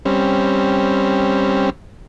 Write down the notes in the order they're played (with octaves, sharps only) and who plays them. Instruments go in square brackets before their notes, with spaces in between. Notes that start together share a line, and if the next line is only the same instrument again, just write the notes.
[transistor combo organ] G3 C4 C#4